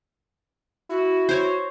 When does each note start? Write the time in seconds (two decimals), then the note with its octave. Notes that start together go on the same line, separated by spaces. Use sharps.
0.90 E4 F#4
1.29 C5 C#5